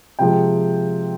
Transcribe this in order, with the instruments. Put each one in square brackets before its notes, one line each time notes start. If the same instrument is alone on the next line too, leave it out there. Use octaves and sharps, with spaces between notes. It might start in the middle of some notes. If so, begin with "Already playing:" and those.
[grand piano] C3 F3 G#3 G5